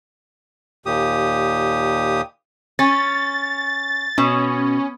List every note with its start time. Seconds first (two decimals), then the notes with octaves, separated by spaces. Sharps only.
0.86 D#2 A#2 G4 D#6
2.79 C#4 A6
4.18 B2 C#4